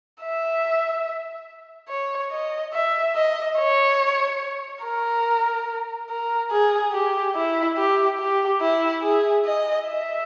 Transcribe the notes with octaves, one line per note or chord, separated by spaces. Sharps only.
E5
C#5
D#5
E5
D#5
C#5
A#4
A#4
G#4
G4
E4
G4
G4
E4
G#4
D#5
E5